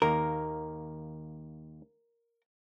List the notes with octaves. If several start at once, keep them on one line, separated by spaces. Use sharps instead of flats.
D#2 A#3 A#4